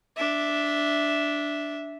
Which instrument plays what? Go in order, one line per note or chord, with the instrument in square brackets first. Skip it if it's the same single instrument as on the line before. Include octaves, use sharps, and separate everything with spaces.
[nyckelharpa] D4 E5